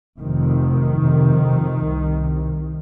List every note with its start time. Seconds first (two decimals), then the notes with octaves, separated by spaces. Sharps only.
0.19 F1 F2 C3 D#3
1.02 F1 F2 C3
1.83 C2 C3